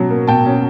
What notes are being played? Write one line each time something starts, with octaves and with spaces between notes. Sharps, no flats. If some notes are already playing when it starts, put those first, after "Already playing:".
Already playing: B2 F#3 C#4
A#3
B2 G5 A5
C#4